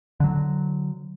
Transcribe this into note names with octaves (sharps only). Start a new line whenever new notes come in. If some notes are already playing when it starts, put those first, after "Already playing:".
D3 F#3